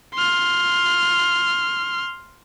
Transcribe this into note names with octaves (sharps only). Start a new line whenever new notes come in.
C6 F6